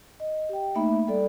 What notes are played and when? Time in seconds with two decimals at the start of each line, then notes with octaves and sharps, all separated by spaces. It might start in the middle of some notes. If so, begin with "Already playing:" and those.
0.20 D#5
0.49 G4 G5
0.75 A3 A#3 D#4 E5 B5
1.07 G3 A4 D5